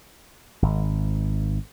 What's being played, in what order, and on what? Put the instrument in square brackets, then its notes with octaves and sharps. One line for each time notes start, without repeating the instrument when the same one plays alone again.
[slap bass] G#1